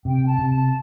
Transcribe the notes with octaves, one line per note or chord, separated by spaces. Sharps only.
C3 G5
A5
C3
A5